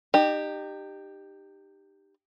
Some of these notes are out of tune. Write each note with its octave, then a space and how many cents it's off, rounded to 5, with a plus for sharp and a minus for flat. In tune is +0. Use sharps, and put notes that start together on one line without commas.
D#4 -35 G4 +5